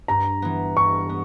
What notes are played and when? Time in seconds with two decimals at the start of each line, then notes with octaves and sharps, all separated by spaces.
0.08 G2 A#5
0.42 E3 B3
0.76 G2 C#6
1.09 B3